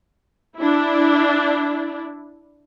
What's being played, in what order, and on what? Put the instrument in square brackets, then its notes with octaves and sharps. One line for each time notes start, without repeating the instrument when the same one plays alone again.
[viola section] D4 E4